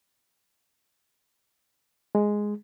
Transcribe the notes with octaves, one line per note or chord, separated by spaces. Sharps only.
G#3